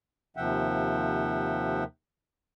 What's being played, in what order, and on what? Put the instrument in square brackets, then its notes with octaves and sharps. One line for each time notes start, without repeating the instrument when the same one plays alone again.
[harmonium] D#2 C3 F3 E5 F#5 G5